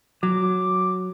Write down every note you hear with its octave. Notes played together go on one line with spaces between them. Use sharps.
F#3 D6